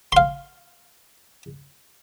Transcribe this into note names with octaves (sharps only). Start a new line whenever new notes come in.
F5 C6